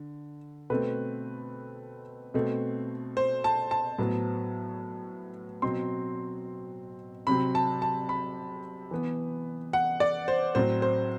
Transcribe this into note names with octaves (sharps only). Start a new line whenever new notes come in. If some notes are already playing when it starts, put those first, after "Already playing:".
Already playing: D3
B2 A3 C4 B4
B2 A3 C4
C5
A5
A5
A2 F#3 B3
B2 F#3 C4 C6
C3 F#3 C4 B5
A5
A5
B5
E3 B3
F#5
D5
C5
A2 F#3 C4 C5
C5